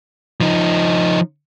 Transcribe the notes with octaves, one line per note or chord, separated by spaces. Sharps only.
F3 D#4